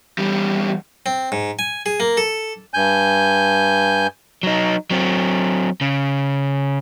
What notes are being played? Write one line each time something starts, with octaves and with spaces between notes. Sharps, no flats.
E2 G3
C4
G#2
G#5
G#4
A#3
A4
G2 G#5 G6
F#3 D#4
F#3 C4
C#3